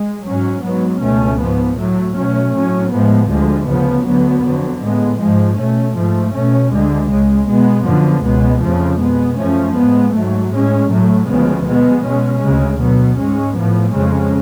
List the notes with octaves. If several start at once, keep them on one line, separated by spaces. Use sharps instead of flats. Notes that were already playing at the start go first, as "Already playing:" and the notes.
Already playing: G#3
G#2 F#3 C#4
G#2 F#3 B3
C#2 B2 A3 C#4
G#2 F3 B3
A2 F#3 A3
B2 F#3 A3 C#4
A2 F#3 C#4
A2 F3 G#3 B3
D2 D3 F3 G#3
D2 C#3 F3 B3
D2 D3 F#3 B3
F2 D3 F#3
A2 G#3 B3
G#2 F3 G#3
B2 A3 C#4
G#2 F3 A3
B2 A3 C#4
D2 D3 G#3
C#2 C#3 G#3
B2 G#3 B3
F#2 D3 F3 B3
C#2 B2 G#3 B3
F2 C#3 F3 A3
B2 G#3 B3
F#2 F3 A3 C#4
A2 G#3 B3
G#2 F#3 A3
A2 G#3 C#4
A2 F#3 A3
D2 C#3 F3 G#3 B3
B2 G#3 B3
B2 G#3 C#4
D2 C#3 G#3
B2 F#3 B3
G#2 G#3 C#4
A2 F3 B3
F2 C#3 G#3 C#4